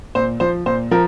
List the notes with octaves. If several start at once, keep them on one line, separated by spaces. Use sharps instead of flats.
A#2 C5
F3 C5
A#2 C5
F3 A#4